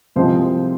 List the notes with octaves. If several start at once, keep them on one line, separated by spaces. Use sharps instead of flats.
C2 C3 F3 G#3 C5